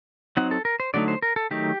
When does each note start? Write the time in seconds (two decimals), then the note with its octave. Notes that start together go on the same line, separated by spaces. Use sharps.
0.37 F#3 C4 D#4 F#5
0.51 A4
0.65 A#4
0.80 C5
0.94 D3 F#3 A3 D#4 D5
1.08 C5
1.22 A#4
1.36 A4
1.51 D#3 F#3 A3 D#4 G4